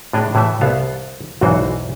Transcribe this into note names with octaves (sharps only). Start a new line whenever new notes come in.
A2 D4 G#4 G5 A#5
A2 E3 A3 E5
C2 B3 F5 A5
B1 E2 G#2 E3 F#4 C5